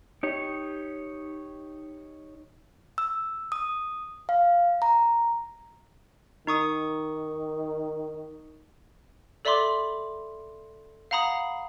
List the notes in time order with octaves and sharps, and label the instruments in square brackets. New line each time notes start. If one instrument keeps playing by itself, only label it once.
[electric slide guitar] D#4 G4 C#5
[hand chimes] E6
D#6
F5
A#5
[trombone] D#3 [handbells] D#4 C#6 D#6
[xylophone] A4 D5 E5 B5 C6 D6
F5 F#5 A#5 B5 D#6